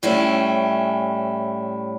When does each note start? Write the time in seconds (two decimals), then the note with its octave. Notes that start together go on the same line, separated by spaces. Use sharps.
0.03 A2 G3 C#4 E4